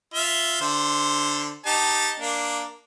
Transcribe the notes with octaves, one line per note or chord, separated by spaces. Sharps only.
F4 E5
D3 C5
D#4 G4 A5
A#3 D4